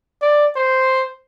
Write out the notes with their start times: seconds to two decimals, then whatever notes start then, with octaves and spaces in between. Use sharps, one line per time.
0.22 D5
0.56 C5